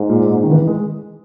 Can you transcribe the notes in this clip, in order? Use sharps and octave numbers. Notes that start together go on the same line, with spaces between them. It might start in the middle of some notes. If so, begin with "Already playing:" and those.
Already playing: G#2
A#2
D#3
E3
G#3